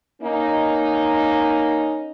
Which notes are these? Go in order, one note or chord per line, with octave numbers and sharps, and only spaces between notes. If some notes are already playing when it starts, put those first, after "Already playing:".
A#3 C#4 D#4